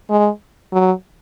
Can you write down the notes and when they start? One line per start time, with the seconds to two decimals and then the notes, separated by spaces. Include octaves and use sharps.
0.10 G#3
0.72 F#3